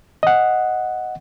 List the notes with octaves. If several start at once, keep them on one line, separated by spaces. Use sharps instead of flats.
D#5 F#5